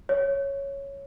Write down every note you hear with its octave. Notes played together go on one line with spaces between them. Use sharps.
C#5